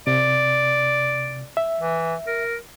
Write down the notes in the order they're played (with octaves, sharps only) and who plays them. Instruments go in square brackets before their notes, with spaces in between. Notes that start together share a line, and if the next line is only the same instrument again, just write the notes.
[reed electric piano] C3 [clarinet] D5
[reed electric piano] E5
[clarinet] E3
A#4